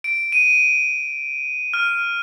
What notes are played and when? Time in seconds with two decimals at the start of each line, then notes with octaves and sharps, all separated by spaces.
0.04 D7
0.32 D#7
1.74 F6